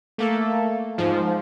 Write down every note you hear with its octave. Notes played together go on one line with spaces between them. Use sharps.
A3 A#3 A4
G#2 F3